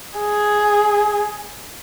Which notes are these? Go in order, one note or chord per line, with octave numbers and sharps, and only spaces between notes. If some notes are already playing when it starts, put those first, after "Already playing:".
G#4